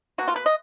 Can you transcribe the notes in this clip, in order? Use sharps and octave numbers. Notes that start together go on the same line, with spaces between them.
B2 A#3 F#4
F4
B4
D#5